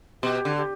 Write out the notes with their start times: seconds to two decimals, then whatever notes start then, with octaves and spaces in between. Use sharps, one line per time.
0.22 B2 G4
0.45 D3
0.57 G4